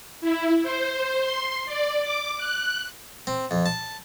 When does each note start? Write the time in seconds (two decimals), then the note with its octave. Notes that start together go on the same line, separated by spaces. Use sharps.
0.21 E4
0.63 C5
1.20 C6
1.66 D5
2.01 D6
2.37 F#6
3.27 C4
3.51 F2
3.66 A5